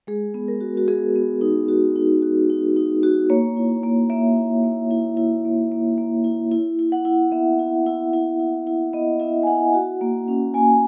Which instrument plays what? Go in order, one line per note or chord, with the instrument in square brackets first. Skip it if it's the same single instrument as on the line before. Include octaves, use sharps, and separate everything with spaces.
[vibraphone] G#3 G#4
B3
A#4
F#4
F#4
B3 G#4
B3
D#4
F#4
D#4
F#4
D#4
D#4
F#4
A#3 C#5
E4
A#3
A#3 E5
E4
A#3
E4
E4
A#3
A#3
A#3
E4
E4
E4
F#5
E4
B3 E5
E4
E4
E4
E4
E4
B3 D#5
E4 E5
G#5
E4 F#5
F#4
A#3
C#4
A#3 G#5